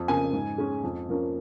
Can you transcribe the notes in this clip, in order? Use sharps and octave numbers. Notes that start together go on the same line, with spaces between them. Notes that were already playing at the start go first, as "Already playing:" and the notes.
Already playing: F2
C#3 A#3 G#5
G#2
G#3 C#4
F2
F3 A#3 C#4